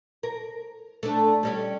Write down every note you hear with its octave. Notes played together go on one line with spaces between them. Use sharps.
A#4
A3 D4
G3 C#4 G4